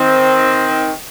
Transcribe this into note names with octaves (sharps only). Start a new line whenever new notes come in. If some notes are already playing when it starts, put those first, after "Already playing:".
Already playing: D#3 C4